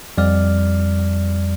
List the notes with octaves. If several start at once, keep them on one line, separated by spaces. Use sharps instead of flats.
F2 G3 D5 F6